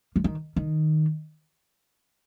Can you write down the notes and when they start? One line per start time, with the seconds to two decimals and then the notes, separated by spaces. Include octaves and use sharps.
0.16 F3
0.24 D#3
0.56 D#3